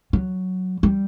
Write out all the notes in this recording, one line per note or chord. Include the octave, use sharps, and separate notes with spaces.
F#3
G3